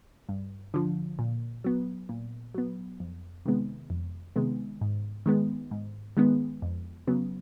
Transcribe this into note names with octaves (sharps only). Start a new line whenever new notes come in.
G2
D3 F3
A#2
F#3 B3
A#2
F#3 B3
F2
C3 D#3 G#3 B3
F2
C3 D#3 G#3 B3
G#2
D#3 G#3 B3
G#2
D#3 G#3 B3
F2
C#3 F#3 B3